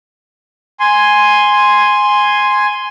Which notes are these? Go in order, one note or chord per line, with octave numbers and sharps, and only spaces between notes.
G#5 C6